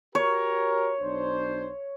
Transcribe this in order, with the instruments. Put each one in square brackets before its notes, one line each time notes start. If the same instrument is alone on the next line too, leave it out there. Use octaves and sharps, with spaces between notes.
[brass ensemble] F#4 G4 A#4 [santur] C#5
[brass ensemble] B1 D4 C5